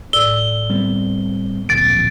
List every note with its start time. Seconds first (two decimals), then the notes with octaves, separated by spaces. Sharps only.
0.13 A2 D5 E6 G7
0.70 G3 B3 C4
1.69 D1 A#1 F2 A6 D7